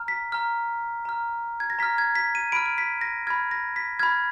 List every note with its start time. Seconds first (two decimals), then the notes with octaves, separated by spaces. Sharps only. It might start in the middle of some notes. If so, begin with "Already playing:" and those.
Already playing: A#5 F6
0.08 B6
0.32 A#5 F6
1.05 A#5 F6
1.60 G#6
1.70 A#6
1.79 A#5 B6
1.83 F6
1.98 G#6
2.15 B6
2.35 D#7
2.52 B5 F6 D7
2.66 D7
2.78 B6
3.01 A#6
3.27 F6 G#6
3.30 B5
3.51 A#6
3.76 B6
3.99 B5 F6 G#6